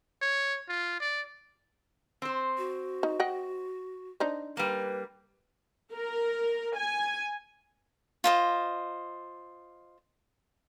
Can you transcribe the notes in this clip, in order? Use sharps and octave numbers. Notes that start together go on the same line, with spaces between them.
C#5
F4
D5
C4 C5
F#4
D#4
D#5 F#5 G5
D4 D#4 C5
G3 A#3 B4
A#4
G#5
F4 C5 D#5